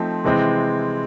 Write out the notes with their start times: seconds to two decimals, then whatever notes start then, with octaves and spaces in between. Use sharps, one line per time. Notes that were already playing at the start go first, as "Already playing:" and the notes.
Already playing: F3 A3 C4 D#4
0.25 C3 E3 G#3 C4